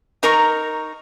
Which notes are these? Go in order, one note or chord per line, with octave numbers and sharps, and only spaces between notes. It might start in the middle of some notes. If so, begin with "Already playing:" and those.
D#4 A#4 A#5 C#6